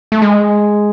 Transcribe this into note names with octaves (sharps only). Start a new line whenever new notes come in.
A3
G#3